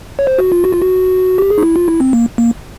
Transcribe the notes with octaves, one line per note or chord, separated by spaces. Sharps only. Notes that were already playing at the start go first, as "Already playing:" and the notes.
C#5
C5
F#4
F4
F#4
F4
F#4
G4
G#4
D#4
E4
F4
E4
C4
A#3
A#3